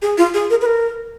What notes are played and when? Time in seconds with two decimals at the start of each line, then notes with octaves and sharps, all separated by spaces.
0.02 G#4
0.18 F4
0.34 G#4
0.50 A#4
0.61 B4
0.66 A#4